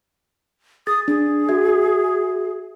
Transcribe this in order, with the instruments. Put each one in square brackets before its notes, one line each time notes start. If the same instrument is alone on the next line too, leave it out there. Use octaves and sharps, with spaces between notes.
[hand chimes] G#4 A6 [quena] D#6
[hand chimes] D4 [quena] G#4
[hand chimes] F#4 E5 G#6